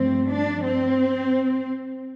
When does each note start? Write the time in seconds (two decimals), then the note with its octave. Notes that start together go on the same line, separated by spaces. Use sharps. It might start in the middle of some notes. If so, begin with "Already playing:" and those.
Already playing: G2 F3 A3 C4
0.29 D4
0.64 C4